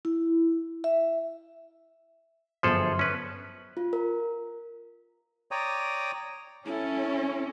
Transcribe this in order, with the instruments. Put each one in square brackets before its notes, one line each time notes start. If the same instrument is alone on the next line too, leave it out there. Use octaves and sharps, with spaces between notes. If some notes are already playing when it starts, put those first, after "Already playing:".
[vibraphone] E4
E5
[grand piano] G1 F#2 C5 [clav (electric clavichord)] F3 G#4 A4
[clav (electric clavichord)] C#4 B4
[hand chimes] F4
A#4
[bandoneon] C#5 D5 G5 A#5 D#6
[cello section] C#4 [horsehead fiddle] E4 A4